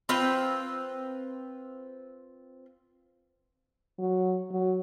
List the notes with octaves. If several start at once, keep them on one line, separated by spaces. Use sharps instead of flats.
C4 F4 B4 G5
F#3
F#3